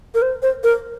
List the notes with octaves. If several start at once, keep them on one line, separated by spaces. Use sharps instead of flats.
A#4
C5
C5
A#4